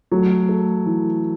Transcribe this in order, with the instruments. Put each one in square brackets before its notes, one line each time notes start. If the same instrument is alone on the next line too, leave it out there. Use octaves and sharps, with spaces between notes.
[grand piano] F#3 [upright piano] A3
[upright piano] A3
E3